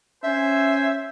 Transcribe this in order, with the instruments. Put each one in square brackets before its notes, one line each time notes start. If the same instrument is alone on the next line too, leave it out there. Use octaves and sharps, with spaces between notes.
[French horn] C#4 [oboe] C5 [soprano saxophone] E5 [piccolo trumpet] G#5